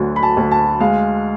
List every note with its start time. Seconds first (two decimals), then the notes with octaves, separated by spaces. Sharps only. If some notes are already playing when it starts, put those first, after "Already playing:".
Already playing: D2 D3 F#3
0.16 B5
0.23 A5
0.37 D2
0.52 A5
0.80 G#3 F5